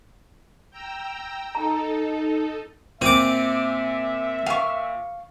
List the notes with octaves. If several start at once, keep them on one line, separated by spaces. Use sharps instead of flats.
G5 A#5 E6
D#4 A4 A#5
A#2 C4 E5 D6 D#7
F5 C#6